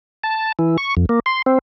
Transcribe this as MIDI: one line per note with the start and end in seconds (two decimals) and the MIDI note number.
0.24 0.52 81
0.59 0.77 52
0.78 0.95 85
0.97 1.06 41
1.09 1.20 58
1.26 1.42 84
1.46 1.59 60